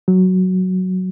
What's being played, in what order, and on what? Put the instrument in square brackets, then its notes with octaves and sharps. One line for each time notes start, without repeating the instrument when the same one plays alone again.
[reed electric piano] F#3